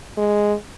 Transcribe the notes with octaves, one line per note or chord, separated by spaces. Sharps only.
G#3